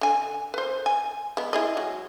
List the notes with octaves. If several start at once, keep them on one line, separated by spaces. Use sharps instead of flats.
D3 G#5
B4 C5
G#5
G#3 B3
E4 G#4 D#5
F#3 G#3